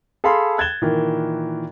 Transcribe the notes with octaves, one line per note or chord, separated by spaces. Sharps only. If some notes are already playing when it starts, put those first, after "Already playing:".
G#4 A4 F5 A5 B5 C6
F#6 G#6 A6 E7 G7
A#2 D#3 E3